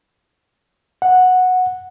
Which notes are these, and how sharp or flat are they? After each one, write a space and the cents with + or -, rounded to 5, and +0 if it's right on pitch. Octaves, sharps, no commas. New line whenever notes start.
F#5 -10